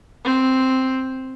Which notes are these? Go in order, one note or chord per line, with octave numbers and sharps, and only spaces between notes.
C4